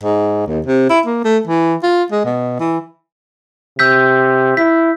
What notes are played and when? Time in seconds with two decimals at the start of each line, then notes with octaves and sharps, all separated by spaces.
0.03 G#2
0.47 D#2
0.67 C3
0.89 E4
1.06 A#3
1.24 A3
1.47 E3
1.83 F4
2.12 G#3
2.25 B2
2.60 E3
3.79 C3 E6 G6 B6
4.57 E4 B6